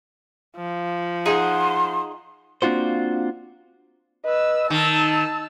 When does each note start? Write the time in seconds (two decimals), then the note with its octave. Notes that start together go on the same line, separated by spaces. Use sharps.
0.56 F3
1.25 D#4 G#4 F#5 C6
2.62 A#3 C4 D4 F4 F#4 C5
4.25 B4 D#5 E6
4.70 D#3 D#4 A5 E6